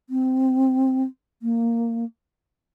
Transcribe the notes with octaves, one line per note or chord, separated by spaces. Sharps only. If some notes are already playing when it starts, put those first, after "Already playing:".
C4
A#3